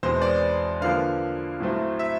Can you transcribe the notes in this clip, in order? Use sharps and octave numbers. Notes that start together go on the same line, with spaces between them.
E2 B2 G#3 C4 C5
D5
D3 F3 A#3 F5
A2 F#3 A3 C4
E5